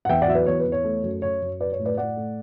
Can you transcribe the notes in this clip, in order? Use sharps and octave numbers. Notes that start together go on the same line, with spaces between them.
F#5
E2 E5 G5
D5 F#5
F#3 E5
B4 D5
E2 C#5
B4
E2
C#5
A3
F#2
F#2 C#5
F#2
F#3 B4 D5
C#5
A2
B4 D5
A2 D5 F#5
A3